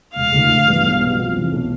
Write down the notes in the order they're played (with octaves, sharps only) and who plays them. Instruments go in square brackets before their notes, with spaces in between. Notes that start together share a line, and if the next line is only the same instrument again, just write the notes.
[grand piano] E1 [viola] F5
[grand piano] D2 D3 A3 E4
A1
G2 E3 G3 B3
B1
B2 G3 B3
F2
C3 E3
B1